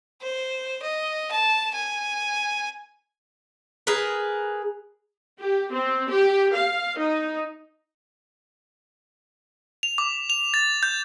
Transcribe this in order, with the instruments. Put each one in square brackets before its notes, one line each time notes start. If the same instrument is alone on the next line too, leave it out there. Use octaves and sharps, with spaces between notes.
[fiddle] C5
D#5
A5
G#5
[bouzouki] G#4 A#4 B4
[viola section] G4
C4
G4
F5
D#4
[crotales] F7
D6
F7
A6
G6